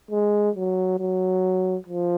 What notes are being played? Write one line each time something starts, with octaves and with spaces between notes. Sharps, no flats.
G#3
F#3
F#3
F3